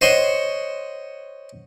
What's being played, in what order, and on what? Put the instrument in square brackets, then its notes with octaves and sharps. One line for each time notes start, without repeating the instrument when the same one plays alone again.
[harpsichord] C5 C#5 D#5 F#5 C6 C#6